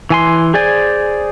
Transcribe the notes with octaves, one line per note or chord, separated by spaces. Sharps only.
E3 G#5 C6
G#4 C5 D5 G#5